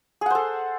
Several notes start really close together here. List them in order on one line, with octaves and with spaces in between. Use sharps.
G#4 F#5 C5 A4